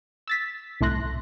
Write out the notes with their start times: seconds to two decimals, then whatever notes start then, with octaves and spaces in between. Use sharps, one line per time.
0.28 E6 A6 B6
0.81 C2 A2 A3 C6 F#6 A#6